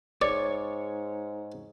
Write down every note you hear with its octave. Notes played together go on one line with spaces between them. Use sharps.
G#2 C#5 D5